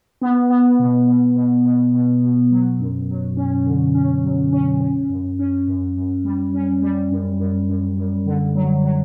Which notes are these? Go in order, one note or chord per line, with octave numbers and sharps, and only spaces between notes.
B3
B3
B2
B2
B2
B2
B2
B2
F#3
F#2
F#3
C#4
D3
C#4
F#3
C#4
C#4
F#2
C#4
F#2
F#2
G3
C#4
G3
F#2
F#2
F#2
F#2
D3
F#3
F#3